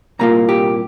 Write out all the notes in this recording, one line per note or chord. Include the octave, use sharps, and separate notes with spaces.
C2 A#2 A#3 F4 A#5
G4